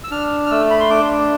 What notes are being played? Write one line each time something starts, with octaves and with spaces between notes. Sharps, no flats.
E6
D4 F6
F6
A3 E6
B5
C6
D4 D6